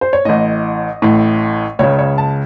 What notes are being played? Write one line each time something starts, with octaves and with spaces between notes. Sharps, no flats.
C5
C#5
A1 A2 D#5
A1 A2
C#2 C#3 C#5
C#5
A5